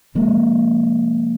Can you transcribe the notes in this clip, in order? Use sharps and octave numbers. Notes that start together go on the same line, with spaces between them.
C3 F3 G#3 A#3